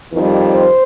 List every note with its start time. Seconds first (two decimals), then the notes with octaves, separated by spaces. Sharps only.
0.12 F2 D#3 G3
0.53 C5